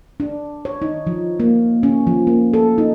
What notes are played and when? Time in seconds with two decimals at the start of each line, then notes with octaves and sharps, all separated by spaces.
0.20 D4
0.65 C#5
0.82 D#4
1.07 F3
1.40 A#3
1.83 C#4
2.07 F3
2.27 A#3
2.54 A4
2.78 D#4